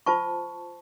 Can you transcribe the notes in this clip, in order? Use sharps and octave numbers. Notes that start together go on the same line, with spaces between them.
F4 C5 A5 C#6